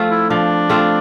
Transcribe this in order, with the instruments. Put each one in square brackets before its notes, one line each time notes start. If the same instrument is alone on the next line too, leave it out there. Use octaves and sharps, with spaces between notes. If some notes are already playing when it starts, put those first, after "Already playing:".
Already playing: [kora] F3 A3 C4 F4
[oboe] E4
[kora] F3 [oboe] D4
[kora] A3 C4 F4